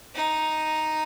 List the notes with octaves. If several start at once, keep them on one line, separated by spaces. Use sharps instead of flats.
D#4